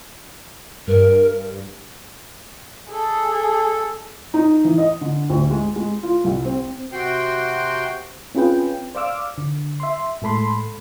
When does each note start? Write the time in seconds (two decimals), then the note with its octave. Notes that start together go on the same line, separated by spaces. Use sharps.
0.87 G2 A#4
2.91 G#4 A4
4.34 D#4
4.65 E3
4.78 D#5
5.01 D3
5.30 D2
5.51 G#3
5.76 G#3
6.03 F4
6.24 C2
6.45 C4
6.93 C3 F#4 G5 C6
8.35 C4 C#4 F4 G#4 B4 G5
8.95 C5 D5 F5 D6 E6 F6
9.38 D3
9.80 E5 C6
10.22 A2 G#3 A4 B5 C6